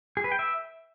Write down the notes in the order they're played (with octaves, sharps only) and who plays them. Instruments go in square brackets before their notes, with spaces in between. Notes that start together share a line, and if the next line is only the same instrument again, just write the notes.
[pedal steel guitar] G#4
B4
G5
E5